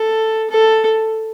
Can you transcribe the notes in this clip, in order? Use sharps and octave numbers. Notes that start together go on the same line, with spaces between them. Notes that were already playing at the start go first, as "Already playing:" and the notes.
Already playing: A4
A4